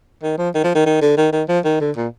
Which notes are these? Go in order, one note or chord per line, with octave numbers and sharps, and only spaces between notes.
D#3
F3
D#3
F3
D#3
D#3
D3
D#3
D#3
F3
D#3
D3
A#2